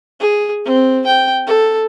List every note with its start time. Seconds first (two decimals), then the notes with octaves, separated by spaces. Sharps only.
0.20 G#4
0.65 C4
1.06 G5
1.47 A4